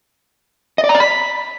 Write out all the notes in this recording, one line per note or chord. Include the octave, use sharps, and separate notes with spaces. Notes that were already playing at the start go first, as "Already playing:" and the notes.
D#5
D5
A#5
D5
B5